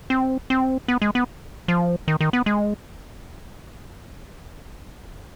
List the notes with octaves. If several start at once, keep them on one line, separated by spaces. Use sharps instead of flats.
C4
C4
B3
G#3
B3
F3
D#3
D#3
B3
G#3